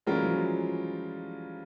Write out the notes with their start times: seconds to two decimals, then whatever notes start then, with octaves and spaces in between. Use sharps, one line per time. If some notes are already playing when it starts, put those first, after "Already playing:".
0.07 E3 G3 G#3 C#4 F4 A#4
0.15 F#3
0.22 F3
0.31 F#3